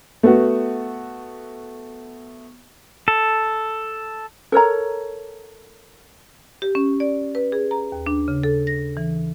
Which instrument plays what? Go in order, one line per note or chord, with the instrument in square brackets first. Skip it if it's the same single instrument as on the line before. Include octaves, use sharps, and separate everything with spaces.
[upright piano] A3 B3 F#4
[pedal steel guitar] A4
[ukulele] A4 A#4 C#5 A#5
[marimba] G4
C#4
D5
B4
G#4
A#5
D#2
D4
C#3
A4
A#6
E3